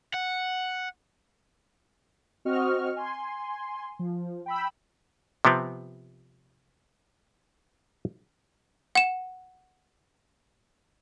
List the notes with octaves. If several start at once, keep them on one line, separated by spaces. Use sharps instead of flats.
F#5
C4 F#4 D#5 C#6 F6
G#5 C6
F3
G5 B5 E6
C3 F3 B3 C4
F#5 E7